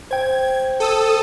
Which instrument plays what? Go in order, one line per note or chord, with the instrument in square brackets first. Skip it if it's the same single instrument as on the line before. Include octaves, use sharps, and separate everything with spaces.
[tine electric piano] C5 G5 [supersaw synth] G#6
[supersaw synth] A4 D#6 E6